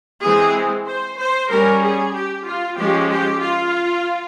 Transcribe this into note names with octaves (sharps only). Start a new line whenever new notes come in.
E3 G#3 C4 G#4
C5
C5
G3 C#4 A#4
G#4
G4
F4
F3 G#3 C#4 G4
G4
F4